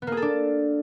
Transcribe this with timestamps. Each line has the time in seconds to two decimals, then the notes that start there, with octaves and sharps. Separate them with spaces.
0.02 B3
0.07 A#3
0.12 G#4
0.17 A4
0.22 D4